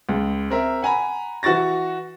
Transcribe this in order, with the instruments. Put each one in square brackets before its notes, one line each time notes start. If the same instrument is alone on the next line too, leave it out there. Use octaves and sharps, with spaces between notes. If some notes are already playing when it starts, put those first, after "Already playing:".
[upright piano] C#2
C4 A#4 E5
F#5 G#5 A#5 B5
E3 F#4 C#6 A6 A#6